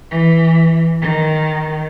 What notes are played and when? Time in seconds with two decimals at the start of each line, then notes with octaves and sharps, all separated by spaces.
0.10 E3
1.01 D#3